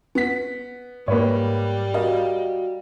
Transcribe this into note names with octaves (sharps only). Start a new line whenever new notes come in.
B3 B6
G#2 G3 A#3 B4 C#5
F#4 A#4 D#5 F5